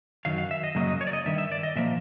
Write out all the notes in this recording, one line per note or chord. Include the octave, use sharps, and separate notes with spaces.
F#2 D#3 F#3 F5
F5
E5
D#5
F#2 C#3 F#3 A#3 D#5
D#5
C#5
D5
D#5
G2 D#3 E5
E5
D5
D#5
A#2 F3 A#3 E5